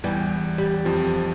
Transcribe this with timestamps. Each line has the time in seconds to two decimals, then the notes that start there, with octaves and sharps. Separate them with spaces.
0.03 E2 E3 G3
0.58 G3
0.85 F2 F3